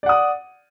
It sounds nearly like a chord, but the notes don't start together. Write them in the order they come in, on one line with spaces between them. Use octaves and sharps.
D5 F#5 D#6